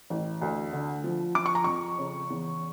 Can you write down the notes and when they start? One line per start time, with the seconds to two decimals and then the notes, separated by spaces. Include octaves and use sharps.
0.10 A1
0.42 D2
0.73 D3
1.04 F3
1.35 F3 D6
1.46 C#6
1.55 A#5
1.64 F2 C#6
1.98 C#3
2.30 E2